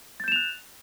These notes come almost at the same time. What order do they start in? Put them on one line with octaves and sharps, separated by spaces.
A6 G6 E7 F7 F#6